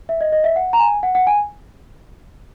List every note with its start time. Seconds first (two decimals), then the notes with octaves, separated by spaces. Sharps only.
0.09 E5
0.21 D#5
0.32 D#5
0.44 E5
0.56 F#5
0.73 A#5
0.79 G#5
1.03 F#5
1.15 F#5
1.27 G#5